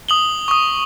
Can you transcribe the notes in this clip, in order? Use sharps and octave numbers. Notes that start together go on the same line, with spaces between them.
D#6 F#7 G7
C#6 D#6